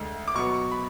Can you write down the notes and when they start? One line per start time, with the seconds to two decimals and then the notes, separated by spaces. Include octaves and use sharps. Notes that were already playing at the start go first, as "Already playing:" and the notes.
Already playing: D2 D3 G#3
0.28 D6
0.34 B2 F#3 B3 C#6
0.72 B5